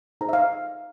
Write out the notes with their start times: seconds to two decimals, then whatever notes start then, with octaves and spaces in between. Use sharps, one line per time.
0.21 D#4 G#4 C5 A#5
0.29 E5
0.33 F5